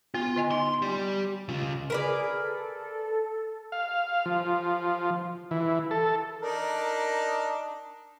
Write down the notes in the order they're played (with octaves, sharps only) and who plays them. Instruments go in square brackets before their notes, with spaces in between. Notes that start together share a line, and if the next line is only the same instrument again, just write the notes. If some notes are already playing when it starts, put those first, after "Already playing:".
[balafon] B3 [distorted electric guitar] F4
[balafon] D3 D#5 G#5
[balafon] D#4 G#5 [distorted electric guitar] C6
[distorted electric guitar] G4 D5
C#3 F4
[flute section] G#4 [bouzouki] A#4 B4 D5
[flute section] A4
[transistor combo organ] F5
F3
E3
A4
[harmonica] D4 D#4 D5 [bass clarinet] A#4